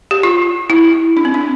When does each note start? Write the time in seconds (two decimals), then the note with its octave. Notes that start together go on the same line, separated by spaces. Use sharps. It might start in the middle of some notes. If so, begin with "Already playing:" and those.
0.11 G4
0.23 F4
0.70 E4
1.17 D4
1.25 C4
1.34 D4